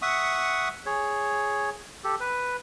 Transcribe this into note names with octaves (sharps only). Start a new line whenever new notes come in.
E5 F#5 C#6 D#6
G#4 C#5
G4 A4
B4